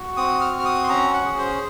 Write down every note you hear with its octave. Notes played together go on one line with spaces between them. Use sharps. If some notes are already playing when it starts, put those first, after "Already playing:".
Already playing: F#4
C4 D#6
F6
F#4
F6
D#6
C6
C#4 A#5
F#5
G#4
C5